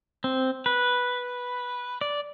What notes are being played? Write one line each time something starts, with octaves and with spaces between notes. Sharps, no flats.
C4
B4
D5